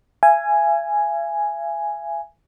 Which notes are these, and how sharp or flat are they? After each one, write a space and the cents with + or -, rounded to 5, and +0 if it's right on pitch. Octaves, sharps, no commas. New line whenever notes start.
E5 +45 G#5 +0